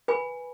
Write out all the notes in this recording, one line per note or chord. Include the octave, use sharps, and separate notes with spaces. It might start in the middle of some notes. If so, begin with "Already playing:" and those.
B4 G#5 B5